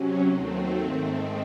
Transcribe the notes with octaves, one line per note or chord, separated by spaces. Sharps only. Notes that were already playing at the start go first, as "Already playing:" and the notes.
Already playing: C3 F#3 C#4
D#2 D#3 F#3 A3 C4
G#2 D#3 A3 C4